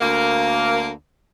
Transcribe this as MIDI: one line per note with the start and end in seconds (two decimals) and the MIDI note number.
0.01 0.89 38
0.01 0.89 58